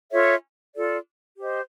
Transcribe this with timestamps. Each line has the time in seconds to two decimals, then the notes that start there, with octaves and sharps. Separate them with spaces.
0.11 F4 A4 C#5 E5
0.75 F4 A4 D5
1.38 G4 C5 D#5